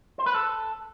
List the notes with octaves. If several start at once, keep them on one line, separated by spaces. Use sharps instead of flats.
C5
B4
A4